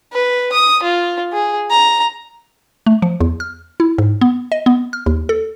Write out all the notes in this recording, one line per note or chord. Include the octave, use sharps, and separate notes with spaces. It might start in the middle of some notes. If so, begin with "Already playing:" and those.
B4
D#6
F4
G#4
A#5
A3
F3
E2
F6
E4
G#2
B3
D#5
B3
F6
D#2
A4